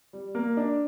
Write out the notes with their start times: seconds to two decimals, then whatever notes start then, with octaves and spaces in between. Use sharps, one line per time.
0.13 G3
0.35 A#3
0.57 D4